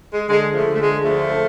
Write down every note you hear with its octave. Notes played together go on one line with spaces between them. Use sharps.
G#3
D3 G#3
F3 A3
D3
A3
G#3
D2 F3 A3